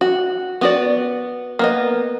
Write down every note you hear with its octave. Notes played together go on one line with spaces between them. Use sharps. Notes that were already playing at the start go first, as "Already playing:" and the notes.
F#4
B3 F#4 D5
A#3 B3 D#5